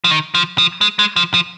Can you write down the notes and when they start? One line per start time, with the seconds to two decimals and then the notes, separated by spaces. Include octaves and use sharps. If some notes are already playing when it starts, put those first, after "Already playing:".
0.04 F3
0.11 D#3
0.35 F3
0.58 F3
0.81 G#3
0.99 G#3
1.16 F3
1.34 F3